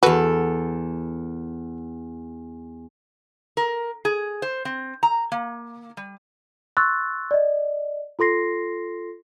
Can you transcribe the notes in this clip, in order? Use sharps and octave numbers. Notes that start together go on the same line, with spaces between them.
E2 F#4 A4 B4
A#4
G#4
C5
C4
A#5
A#3
G3
C6 C#6 E6 F#6 A6
D5 D#5
F4 A4 C6 A#6 C7